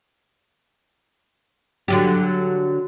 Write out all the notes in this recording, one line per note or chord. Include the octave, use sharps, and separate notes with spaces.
D3 F#3 G4